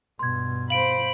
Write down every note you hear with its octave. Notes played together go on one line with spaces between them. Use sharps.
G2 B2 C6 G#6
C5 F5 B5 D7 F#7